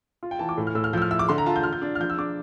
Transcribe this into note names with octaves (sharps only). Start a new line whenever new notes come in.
F4
G5
E3 A5
D6
A2
F6
A2 E6
F6
F3 E6 G6
F6
E4 E6
D6
D3 C6
A#5
F4 A5
G6
F4 F6
G6
D4
F6
F3 G6
E6
D4 D6